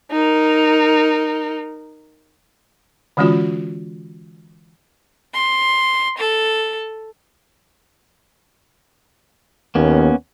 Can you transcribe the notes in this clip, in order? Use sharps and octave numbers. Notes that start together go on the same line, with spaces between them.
D#4 A#4
D3 E3 G#3 C#4 F4 F#4
C6
A4
D#2 A#3 B3 C#4